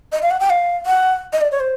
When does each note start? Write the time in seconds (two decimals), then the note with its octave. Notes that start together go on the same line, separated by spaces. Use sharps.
0.12 D#5
0.22 F5
0.31 F#5
0.40 G5
0.50 F5
0.86 F#5
1.33 D#5
1.41 D5
1.52 C#5
1.60 C5